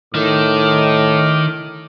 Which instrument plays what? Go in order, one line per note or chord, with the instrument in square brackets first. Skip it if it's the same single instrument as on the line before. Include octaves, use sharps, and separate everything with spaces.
[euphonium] A2 [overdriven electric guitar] D#3 [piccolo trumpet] D6